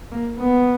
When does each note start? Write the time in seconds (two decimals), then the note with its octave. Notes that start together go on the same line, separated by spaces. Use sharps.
0.12 A#3
0.40 B3